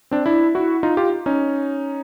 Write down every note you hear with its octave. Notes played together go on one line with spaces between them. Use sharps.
C4 D4
D4 E4
E4 F#4
D#4 F4
F4 G4
C#4 D#4